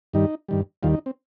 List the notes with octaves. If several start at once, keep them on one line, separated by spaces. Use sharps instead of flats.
G2 D#3 G3 D#4
G2 D#3 G3
D#2 D#3 G3 F4
D#4
C4